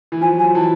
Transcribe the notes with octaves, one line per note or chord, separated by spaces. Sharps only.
E3
F3 G#5
F#3
G#5
F3
E3 A5